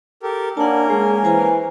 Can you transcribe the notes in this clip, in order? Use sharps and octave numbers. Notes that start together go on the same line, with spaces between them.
G4 A4 A#4
A#3 C#4 D4 A#4 F#5 A5
G#3 G#4
E3 C5 G#5 A#5